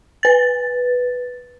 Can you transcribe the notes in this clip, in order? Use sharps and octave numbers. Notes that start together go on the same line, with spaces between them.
B4 A6